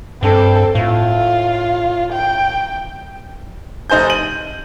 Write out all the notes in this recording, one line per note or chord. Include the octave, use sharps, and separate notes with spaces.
G2 C4 A4
A2 F4
G5
F1 D#4 C5 G#5 G6
D#7 F#7